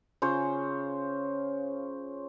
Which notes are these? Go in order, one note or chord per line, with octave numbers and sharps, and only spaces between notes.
C#3 F4 C5 C#5